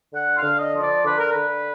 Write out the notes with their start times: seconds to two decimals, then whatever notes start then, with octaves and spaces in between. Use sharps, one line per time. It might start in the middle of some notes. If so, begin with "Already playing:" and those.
0.12 D3 F#5
0.36 F5
0.43 D3
0.58 D#5
0.74 F3
0.82 D5
1.04 D3 B4
1.18 A#4
1.31 D3 B4